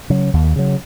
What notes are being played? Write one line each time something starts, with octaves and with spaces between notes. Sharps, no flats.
C#3 F#3
D#2
C#3 F#3